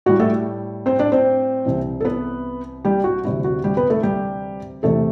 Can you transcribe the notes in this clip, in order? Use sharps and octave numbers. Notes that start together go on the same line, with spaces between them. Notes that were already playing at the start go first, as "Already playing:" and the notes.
A2 G3 F#4
A3 A4
C4 C5
D4 D5
C4 C5
C2 C3 E3
A4
B3 B4
G3 G4
F#4
D2 C3 E3 G3 E4
F#4
G3 G4
B3 B4
A3 A4
G3 G4
E2 C3 E3 A3 A4